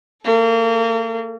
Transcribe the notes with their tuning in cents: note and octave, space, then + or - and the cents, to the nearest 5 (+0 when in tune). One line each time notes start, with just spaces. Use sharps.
A#3 -35 A4 -15